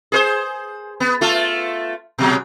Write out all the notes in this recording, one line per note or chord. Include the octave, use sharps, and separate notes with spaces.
G#4 A#4 C5
B3
A3 F4 A4
B2 F#3 G#3